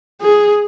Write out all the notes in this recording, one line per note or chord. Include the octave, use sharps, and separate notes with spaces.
G#4